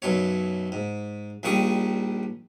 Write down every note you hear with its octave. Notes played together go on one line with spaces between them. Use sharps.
B1 F#2 B2 C#5
G#2
A#1 A#2 D#3 G3 C#6 D#6